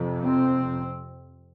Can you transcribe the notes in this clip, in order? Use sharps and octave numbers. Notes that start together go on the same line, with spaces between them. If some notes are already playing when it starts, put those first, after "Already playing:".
Already playing: F2 C3
C4